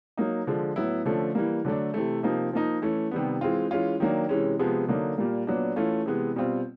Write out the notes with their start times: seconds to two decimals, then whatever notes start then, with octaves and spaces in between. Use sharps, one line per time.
0.17 F#3 A#3 D#4
0.47 D3 F3 G#3
0.76 A2 F#3 B3 E4
1.05 D3 F3 A3 C#4
1.35 E3 G3 A#3
1.65 D3 F#3 A3 D4
1.94 C3 E3 A3
2.23 C3 F3 A#3 D#4
2.53 F3 A#3 D#4
2.82 E3 A3 C#4
3.11 C3 D#3 G3 B3
3.41 E3 G#3 C4 F4
3.71 E3 G#3 C#4 F4
4.00 D#3 F#3 A#3 D4
4.29 C3 E3 G#3 C#4
4.59 C3 F3 G#3 B3
4.88 D3 F#3 A#3 D#4
5.18 A#2 G3 A#3
5.47 A#2 F#3 B3 D4
5.76 E3 A3 C#4 F4
6.06 C3 E3 G#3 B3
6.36 B2 G3 C4 F4